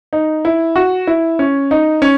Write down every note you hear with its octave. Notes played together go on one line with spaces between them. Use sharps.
D#4
E4
F#4
E4
C#4
D#4
C#4